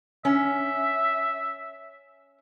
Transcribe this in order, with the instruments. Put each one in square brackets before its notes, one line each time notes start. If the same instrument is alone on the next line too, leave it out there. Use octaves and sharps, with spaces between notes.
[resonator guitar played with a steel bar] C#4 [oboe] E5